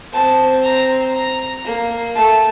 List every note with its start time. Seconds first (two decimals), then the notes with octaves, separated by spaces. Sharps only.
0.12 C4 A5
0.63 A#5
1.14 A#5
1.65 A#3
2.15 A3 A5